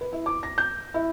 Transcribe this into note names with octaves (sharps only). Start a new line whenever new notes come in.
B4
E4
D6
A#6
G6
E4